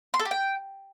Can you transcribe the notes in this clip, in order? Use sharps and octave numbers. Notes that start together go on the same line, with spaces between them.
C6
A4
G4
G5